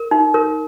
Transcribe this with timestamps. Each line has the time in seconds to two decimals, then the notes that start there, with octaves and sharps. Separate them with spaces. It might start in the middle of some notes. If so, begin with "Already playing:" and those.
Already playing: A#4
0.11 D#4
0.34 A#4